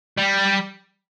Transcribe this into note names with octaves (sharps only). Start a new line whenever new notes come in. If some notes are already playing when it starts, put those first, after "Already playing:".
G3